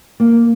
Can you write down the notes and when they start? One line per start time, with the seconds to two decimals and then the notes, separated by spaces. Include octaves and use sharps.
0.20 A#3